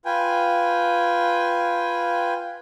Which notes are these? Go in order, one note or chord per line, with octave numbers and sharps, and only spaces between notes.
F4 B4 G5 G#5